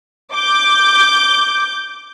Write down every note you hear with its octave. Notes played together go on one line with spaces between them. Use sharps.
D6 G6